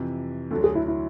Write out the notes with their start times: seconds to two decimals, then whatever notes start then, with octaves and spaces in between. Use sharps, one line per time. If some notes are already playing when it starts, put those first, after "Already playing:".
Already playing: F2 C3 E3
0.51 D2 D3 F#3 A4
0.64 G#4
0.75 E4
0.88 E4